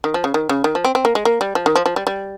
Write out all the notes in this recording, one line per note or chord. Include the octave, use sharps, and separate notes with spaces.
D#3
F3
C#3
D#3
C#3
D#3
F3
C4
C4
A#3
G#3
A#3
G3
F3
D#3
F3
F3
G3
G3